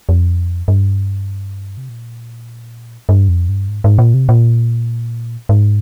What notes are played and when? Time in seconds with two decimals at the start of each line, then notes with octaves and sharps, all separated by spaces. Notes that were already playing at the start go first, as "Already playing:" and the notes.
0.09 F2
0.68 G2
1.77 C3
1.89 A#2
3.09 G2
3.29 F2
3.49 G2
3.69 G#2
3.84 G#2
3.98 A#2
4.14 C3
4.29 A#2
5.49 G#2